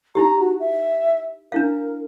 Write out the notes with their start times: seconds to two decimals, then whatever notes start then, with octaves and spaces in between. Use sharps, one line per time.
0.15 D#4 E4 G4 A#5
0.40 F#4
0.60 E5
1.52 D4 E4 A#4 F5